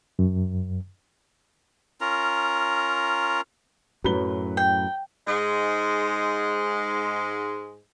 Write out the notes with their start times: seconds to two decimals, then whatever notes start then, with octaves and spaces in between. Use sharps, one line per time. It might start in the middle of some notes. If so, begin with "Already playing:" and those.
0.19 F#2
2.01 C#4 F4 A#4 A#5
4.04 F#2 A2 F#3 B4 G7
4.57 G5
5.28 G#2 G#3